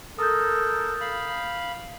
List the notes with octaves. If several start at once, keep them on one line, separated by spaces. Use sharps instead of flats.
A4 A#4 D#6 G6
F5 B5